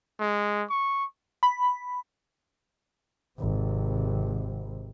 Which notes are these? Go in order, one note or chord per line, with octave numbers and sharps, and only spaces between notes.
G#3
C#6
B5
G#1 C3